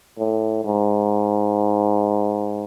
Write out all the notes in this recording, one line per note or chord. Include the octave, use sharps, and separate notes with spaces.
A2
G#2